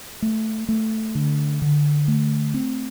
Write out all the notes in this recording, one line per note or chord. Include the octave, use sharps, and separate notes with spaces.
A3
A3
D3
D3
A3
C4